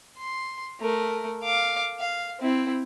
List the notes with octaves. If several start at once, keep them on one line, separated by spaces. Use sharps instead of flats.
C6
A3 A#4
F5 D6
F5
C4 E4